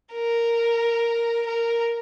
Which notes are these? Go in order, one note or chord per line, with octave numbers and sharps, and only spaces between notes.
A#4
A#4